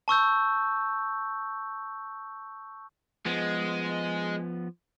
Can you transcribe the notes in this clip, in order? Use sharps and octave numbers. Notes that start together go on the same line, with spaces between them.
A5 C#6 E6 G6
F3 G#3 B3